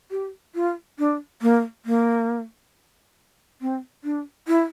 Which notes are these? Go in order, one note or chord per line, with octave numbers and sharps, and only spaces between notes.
G4
F4
D4
A#3
A#3
C4
D4
E4